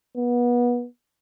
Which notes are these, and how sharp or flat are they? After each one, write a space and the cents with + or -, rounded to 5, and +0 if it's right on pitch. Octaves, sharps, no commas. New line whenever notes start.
B3 -25